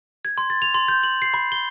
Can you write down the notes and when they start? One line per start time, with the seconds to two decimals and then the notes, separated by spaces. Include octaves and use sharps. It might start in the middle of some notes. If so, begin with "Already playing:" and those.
0.25 G#6
0.38 C6
0.50 A6
0.62 F7
0.74 C6
0.88 G6
1.03 F#7
1.22 C7
1.34 B5
1.52 G7